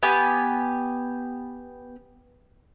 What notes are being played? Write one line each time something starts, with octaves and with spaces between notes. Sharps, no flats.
B3 G4 G#5 D6